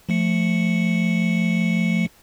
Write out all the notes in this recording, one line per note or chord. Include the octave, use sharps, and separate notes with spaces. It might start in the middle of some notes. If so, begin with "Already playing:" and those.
F3 A3 C#7